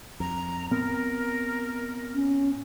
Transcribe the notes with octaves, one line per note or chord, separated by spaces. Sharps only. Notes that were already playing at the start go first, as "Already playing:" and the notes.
F2 A#5
A2 B3 C4 A#4
C#4